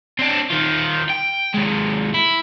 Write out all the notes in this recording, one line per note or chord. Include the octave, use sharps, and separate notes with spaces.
C4 D4
D#3 F4
G5
D#2 G#3
E4